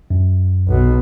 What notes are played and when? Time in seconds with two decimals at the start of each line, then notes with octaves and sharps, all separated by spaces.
0.11 F#2
0.67 B1 B2